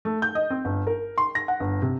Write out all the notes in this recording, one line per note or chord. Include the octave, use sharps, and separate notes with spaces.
A3
G6
D#5
C4
G1
A#4
C6
A#6
F#5
G1
C3